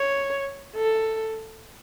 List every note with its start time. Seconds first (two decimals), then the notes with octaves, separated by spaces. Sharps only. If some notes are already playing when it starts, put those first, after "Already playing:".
Already playing: C#5
0.76 A4